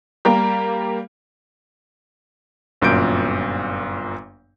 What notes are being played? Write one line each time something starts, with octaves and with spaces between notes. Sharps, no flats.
G3 A#3 G4 A#5
G1 F#2 A#2 G6 D7